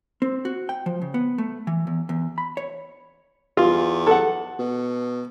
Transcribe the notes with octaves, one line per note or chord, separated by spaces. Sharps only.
C4
F#4
G5
F3
C#3
B3
A3
E3
E2
E2
B5
C#5
E2 F4
A4 F#5
B2